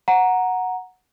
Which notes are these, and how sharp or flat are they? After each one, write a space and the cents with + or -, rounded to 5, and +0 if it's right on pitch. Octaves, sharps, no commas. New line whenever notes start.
F#5 -5 A#5 +0